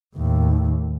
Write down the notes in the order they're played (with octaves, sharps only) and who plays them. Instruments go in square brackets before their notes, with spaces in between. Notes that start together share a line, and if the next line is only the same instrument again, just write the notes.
[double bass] D#2 A2